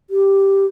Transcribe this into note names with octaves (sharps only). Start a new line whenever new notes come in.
G4